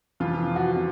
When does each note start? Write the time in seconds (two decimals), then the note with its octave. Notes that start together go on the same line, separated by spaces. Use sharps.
0.20 F2 C3 E3 F4
0.56 F#4
0.76 C3